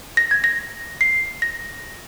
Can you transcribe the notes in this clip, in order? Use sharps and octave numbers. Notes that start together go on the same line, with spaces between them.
A#6
G#6
A#6
C7
A#6